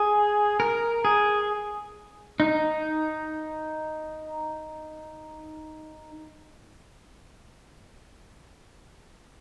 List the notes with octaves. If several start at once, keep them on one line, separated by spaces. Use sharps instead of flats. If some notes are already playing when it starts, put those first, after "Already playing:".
Already playing: G#4
A#4
G#4
D#4